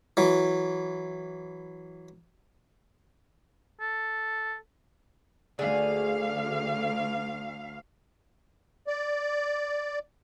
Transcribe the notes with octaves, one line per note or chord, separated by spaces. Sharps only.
E3 F#3
A4
D2 D3 G#4 F5 G#5
D5